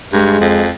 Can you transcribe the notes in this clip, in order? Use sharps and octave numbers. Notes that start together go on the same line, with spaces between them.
G2 G#3
F2